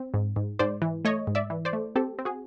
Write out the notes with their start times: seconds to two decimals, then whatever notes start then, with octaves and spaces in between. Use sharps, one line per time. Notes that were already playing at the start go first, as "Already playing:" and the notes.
Already playing: C4
0.14 G#2
0.36 G#2
0.59 G#2 C5 D5
0.82 E3
1.05 A3 C#5 D#5
1.27 G#2
1.35 D5 E5
1.50 E3
1.65 C5 D5
1.73 A3
1.95 C4 G4 A4
2.19 C4
2.25 F#4 G#4